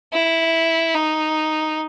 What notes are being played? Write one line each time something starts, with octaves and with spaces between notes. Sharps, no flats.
E4
D#4